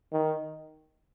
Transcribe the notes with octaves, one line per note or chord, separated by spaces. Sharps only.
D#3